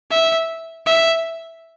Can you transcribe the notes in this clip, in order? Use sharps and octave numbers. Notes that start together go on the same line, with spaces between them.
E5
E5